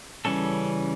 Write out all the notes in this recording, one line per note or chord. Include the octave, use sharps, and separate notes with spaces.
C#3 E3 G3 C#4 A4